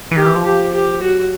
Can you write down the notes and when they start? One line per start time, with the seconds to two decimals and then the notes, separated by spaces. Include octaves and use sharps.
0.11 E3
0.16 D#3 G4
0.26 E3
0.35 F3
0.45 G4
0.73 G4
1.01 F#3 F#4